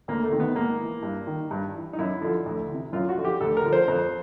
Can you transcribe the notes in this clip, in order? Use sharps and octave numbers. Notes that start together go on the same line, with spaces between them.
D2 A#3
A3
C3 D#3
B3
G#2 A#3
E3
G2
D#3
G2
E3
D#4
F#2 E4
D3 F3
D2
C3 E3
F#2 F4
F#4
D3 F3
G4
D2 A4
A#4
D3 F3
C5
F2